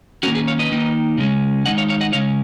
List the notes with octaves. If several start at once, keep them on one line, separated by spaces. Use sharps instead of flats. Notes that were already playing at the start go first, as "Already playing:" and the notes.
D#3 A#3 C#4 F#4 A#4
G#4 B4
C#5 F5
B4 D#5
D#3 A#3 D#4
C#3 G#3 C#4
D#3 G#3 D#4 D#5 F#5
C#5 F5
C#5 F5
D#5 F#5
C#3 G#3 C#4 C#5 F5